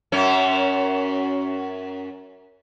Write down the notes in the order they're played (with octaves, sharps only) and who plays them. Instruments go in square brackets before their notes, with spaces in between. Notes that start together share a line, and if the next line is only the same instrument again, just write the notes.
[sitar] F#2 C#4